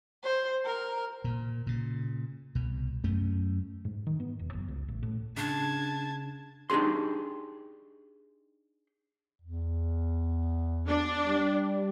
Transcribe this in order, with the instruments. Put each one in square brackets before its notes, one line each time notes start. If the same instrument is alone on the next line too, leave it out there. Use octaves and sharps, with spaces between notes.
[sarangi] C5
A#4
[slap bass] A#2
A#2 C#3
C2 B2
F#2 A3 C#4
[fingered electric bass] G#2
D#3
B3
E1
F#1
C#2
A1
A2
[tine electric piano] C#3 [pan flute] D4 [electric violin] A5 G#6
[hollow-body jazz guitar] D4 D#4 G4 G#4 C6
[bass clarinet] E2
[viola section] D4
[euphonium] G3